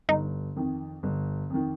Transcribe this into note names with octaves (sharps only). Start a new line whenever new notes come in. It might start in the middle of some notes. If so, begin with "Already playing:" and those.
G1 D#4
F2 D#3
G1
F2 D#3